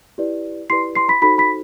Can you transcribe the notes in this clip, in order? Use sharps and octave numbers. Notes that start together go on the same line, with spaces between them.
E4 G4 B4 D5
E4 G4 B4 D5 C6 C7
C6 C7
B5 B6
D#4 F#4 A4 C5 B5 B6
B5 B6